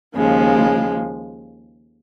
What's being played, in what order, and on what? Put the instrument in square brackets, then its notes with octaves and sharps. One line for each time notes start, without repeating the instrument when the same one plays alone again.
[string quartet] D#2 C#3 F3 G#3